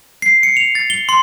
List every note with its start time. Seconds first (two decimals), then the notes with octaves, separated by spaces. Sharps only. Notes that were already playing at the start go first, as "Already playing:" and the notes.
0.22 C7
0.43 C#7
0.57 F7
0.75 A6
0.90 G7
1.09 C6